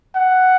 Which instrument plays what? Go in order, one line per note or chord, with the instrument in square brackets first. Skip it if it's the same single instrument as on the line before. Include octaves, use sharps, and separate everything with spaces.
[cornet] F#5